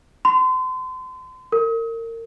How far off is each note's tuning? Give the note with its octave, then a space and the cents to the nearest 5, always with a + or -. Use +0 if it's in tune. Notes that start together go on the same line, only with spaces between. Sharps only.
C6 -35
A#4 -30